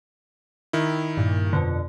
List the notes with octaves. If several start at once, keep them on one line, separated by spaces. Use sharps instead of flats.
D#3 E4
G2 A#2
F2 B2 D3